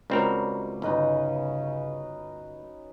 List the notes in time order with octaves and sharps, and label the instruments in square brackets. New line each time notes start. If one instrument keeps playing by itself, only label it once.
[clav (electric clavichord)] C#2 C4 A#4 [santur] F#3 G3
[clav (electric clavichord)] G1 [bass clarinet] C#3 [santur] C#4 D#4 B4